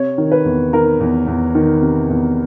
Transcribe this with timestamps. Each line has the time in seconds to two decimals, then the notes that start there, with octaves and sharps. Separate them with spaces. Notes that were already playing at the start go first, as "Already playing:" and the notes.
Already playing: C3 C#5
0.18 D#3
0.31 B4
0.45 E2
0.73 D#3 A#4
1.00 E2
1.27 E2
1.55 D#3
1.82 C3
2.10 E2